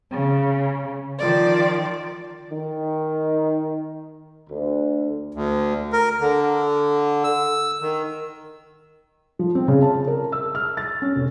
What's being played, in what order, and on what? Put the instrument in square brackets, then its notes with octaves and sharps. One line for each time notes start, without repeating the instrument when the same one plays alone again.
[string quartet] C#3
D#3 F3 D5
[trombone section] D#3
D2
[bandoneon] D2
A#4
D3
E6
D#3
[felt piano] F3
C4
C#3
A5
A#4
E6
F6
A6
C#4
F1